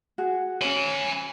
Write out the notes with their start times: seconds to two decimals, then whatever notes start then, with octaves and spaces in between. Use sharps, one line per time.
0.18 F#4 G#4
0.61 C#4 C#5 G#5 B5